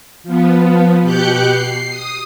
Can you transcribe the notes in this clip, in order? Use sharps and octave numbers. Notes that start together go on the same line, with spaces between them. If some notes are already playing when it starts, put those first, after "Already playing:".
F3 B3
B2 G4 F#6 G6 C#7
C7
D#6